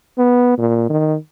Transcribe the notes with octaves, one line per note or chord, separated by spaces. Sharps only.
B3
A#2
D#3